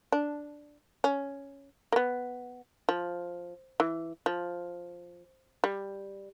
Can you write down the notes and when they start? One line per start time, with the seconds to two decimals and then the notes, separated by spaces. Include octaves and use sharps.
0.12 D4
1.04 C#4
1.92 A#3
1.96 B3
2.89 F3
3.80 E3
4.26 F3
5.64 G3